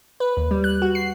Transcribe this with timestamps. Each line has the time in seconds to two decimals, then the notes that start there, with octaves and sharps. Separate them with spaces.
0.20 B4
0.37 D#2
0.51 G3
0.64 F#6
0.82 F#4
0.95 C7